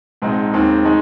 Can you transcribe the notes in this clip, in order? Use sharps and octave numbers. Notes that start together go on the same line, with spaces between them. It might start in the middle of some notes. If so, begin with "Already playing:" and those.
A#1 G#2 G#3 C4 D#4
D#2 D#3 G#3 C4
D#3 G#3 D#4